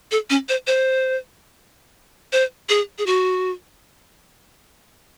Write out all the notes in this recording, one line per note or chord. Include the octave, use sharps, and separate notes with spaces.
A4
C#4
C5
C5
C5
G#4
G#4
F#4